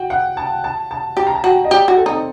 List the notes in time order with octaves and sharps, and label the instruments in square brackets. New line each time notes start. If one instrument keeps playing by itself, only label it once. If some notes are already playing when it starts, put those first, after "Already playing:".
Already playing: [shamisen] F#4 [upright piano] G5
[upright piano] F#5
A5
A5
A5
[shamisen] G4 [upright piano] A5
[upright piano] A#5
A5
[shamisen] F#4 [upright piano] G5
[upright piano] D#5
[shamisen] G4 [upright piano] D5
[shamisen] F#4
[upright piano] A4
[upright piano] C4 [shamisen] D#4